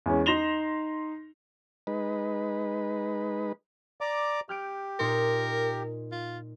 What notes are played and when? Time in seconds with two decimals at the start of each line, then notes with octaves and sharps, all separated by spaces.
0.06 E2 G#3 B3 C#4
0.26 D#4 C6 A#6 E7 F7 G7
1.87 G#3 D#4 B4
4.01 D5 A#5 D6
4.49 G4 F6 G6 D7
5.00 A#2 D#4 A#4 C6
6.12 F4